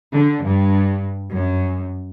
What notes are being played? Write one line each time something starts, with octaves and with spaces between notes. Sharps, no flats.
D3
G2
F#2